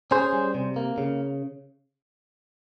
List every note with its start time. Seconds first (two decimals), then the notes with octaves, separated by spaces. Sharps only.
0.11 C#4 G#4 C5
0.33 G3
0.55 C3
0.76 A#3
0.98 C#3